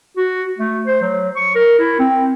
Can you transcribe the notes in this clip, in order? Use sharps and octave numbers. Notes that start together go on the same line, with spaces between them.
F#4
A3
C5
F#3
C#6
A#4
E4
C4